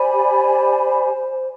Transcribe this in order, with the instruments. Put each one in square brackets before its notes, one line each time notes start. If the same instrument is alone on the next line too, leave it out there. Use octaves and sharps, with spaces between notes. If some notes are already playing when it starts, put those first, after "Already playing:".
Already playing: [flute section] G4 D5 G#5 B5 [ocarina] C5